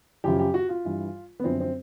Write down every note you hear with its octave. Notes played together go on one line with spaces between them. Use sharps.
F#2 C#3 F3 G4
G4
F#4
F4
G2 E3
B3
F#2 D3 F3 C4
C4